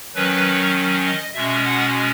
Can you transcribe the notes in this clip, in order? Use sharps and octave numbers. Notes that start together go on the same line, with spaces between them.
D#3 F#3 C#4 B4
D#5
B2 G#3 C#4 E5
F#5